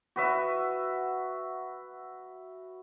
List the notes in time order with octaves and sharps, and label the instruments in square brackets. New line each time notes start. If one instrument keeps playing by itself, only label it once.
[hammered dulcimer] F#4 B4 E5